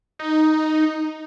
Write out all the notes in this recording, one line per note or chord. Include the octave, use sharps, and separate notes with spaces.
D#4